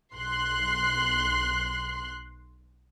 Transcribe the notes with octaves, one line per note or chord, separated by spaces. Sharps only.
B1 C6 F#6